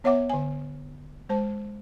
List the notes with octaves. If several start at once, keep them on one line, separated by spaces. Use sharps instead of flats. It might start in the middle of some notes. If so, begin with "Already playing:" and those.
B3 C#5 E5 F#5 D6
D3 G#5
G#3 C5 A5